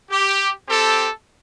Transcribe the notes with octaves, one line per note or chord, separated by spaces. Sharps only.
G4
C4 G4 A4